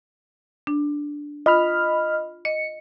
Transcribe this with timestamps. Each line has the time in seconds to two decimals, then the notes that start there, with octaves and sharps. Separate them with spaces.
0.67 D4
1.46 F4 D#5 B5 F6
2.45 D#5 C#7